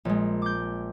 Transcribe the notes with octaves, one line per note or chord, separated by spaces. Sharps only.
A#1 G#3
D6 G6